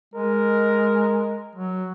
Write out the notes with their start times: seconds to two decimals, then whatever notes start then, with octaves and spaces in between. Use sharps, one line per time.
0.14 G#3 A#4
1.55 F#3